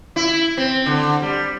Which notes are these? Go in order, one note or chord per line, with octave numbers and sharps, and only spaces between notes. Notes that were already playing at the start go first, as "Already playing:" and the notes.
E4
C4
D3
G3